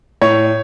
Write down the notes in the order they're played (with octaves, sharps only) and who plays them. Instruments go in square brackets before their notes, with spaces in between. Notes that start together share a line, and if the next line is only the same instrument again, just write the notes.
[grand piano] A2 C#5